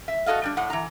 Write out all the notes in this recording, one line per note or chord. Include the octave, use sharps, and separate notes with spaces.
E5
F#4 G#4 A4 D#5 F5
G3 D4
A2 D4 F#5
E3 A#5